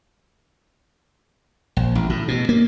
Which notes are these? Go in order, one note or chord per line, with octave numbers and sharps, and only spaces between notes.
A#1
A1
A2
B2
A#3